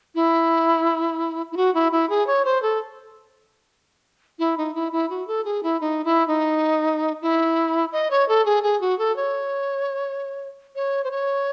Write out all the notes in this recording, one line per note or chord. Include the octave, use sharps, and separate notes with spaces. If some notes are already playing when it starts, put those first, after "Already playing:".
E4
E4
F#4
E4
E4
G#4
C#5
C5
A4
E4
D#4
E4
E4
F#4
A4
G#4
E4
D#4
E4
D#4
E4
D#5
C#5
A4
G#4
G#4
F#4
A4
C#5
C#5
C5
C#5